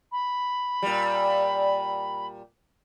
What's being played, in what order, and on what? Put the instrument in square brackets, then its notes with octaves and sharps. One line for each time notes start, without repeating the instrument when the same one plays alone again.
[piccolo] B5
[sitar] A#2 G3